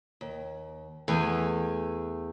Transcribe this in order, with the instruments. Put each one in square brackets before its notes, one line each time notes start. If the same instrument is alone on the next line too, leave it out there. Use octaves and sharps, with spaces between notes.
[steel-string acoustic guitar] D#2
[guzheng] E2 G#5 [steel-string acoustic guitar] A3